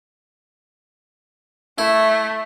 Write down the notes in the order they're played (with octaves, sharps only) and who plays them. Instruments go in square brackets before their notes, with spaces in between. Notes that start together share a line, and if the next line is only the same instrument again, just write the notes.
[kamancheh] A3 [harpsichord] E4